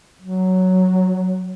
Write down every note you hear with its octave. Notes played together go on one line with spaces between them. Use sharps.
F#3